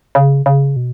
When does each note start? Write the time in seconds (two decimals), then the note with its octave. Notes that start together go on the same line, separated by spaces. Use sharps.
0.15 C#3
0.46 C#3
0.76 B2